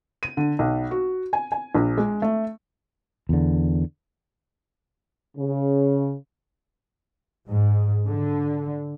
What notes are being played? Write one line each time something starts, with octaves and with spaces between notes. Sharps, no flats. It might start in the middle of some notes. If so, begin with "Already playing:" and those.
D#7
D3
B1
F#4
G#5
G#5
A#1
G#3
A3
E2 D3
C#3
G#2
D3